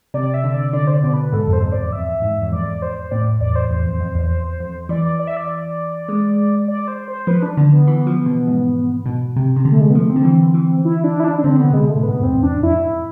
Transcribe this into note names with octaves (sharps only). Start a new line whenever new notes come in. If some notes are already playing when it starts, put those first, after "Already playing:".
C3 D5
E5
D3
D5
D3 D5
C5
D5
B2
B4
G#2 A4
F2
C5
F2
D5
E2
F2 E5
G#2
E2
F2 D5
C5
A2 D5
E2 D5
C5
E2
F2
F2
E2
E2
F2
E3 D5
D5
E5
D5
G#3
D5
C5
C5
F3 B4
D4
D3
B3
E3
F3
B2
G#2
B2
C3
C3
D3
A3
G#3
B3
F3 A3
C4
D3
E3
E3
E4
D4
E4
D4
D4
D3 C4
D3 B3
C3
B2 G#3
A3
A2
B3
G#2
F2 C4
E2
D4
F2 E4